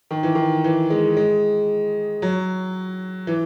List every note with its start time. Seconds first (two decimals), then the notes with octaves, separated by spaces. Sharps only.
0.11 D#3
0.23 E3
0.35 D#3
0.64 E3
0.90 G#3
1.17 G#3
2.22 F#3
3.27 E3